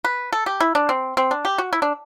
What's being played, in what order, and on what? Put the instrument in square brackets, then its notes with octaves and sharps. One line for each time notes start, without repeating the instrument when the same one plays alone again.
[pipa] B4
A4
G4
E4
D4
C4
C4
D4
G4
F#4
E4
D4